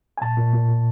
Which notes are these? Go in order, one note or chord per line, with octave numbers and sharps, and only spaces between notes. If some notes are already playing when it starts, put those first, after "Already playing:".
G#5
A#2 A5
A#2
A#2
A#2